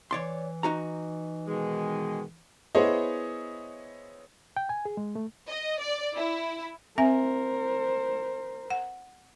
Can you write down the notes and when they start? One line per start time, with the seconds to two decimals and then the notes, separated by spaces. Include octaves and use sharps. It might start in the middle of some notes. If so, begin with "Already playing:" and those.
0.11 E3 C#5 D5 C6
0.63 D#4 F#4 A#5
1.47 B2 D#3 G#3
2.75 B3 E4 G#4 C5 C#5 D#5
4.57 G5
4.69 G#5
4.85 G#4
4.97 G#3
5.16 A3
5.48 D#5
5.81 D5
6.16 E4
6.98 C4 A#4 C5 E5 G#5
8.70 F#5